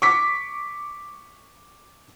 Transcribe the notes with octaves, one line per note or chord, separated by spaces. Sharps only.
C#6 D6 B6